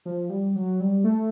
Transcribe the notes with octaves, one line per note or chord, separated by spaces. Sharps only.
F3
G3
F#3
G3
A3